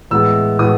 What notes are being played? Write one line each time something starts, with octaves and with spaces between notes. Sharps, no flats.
A2 E3 G#3 B3 E6
A2 E3 G#3 B3 D#6